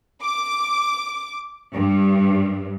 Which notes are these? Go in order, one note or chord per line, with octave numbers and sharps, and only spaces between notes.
D6
G2